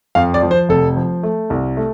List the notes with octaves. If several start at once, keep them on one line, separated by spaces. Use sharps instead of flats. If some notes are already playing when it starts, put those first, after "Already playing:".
F2 F5
D5
F3
C5
F1 A4
F3
A3
C2
A3